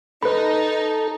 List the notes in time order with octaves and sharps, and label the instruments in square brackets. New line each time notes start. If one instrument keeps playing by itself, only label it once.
[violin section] D#4 [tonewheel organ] A4 [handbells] B4 B5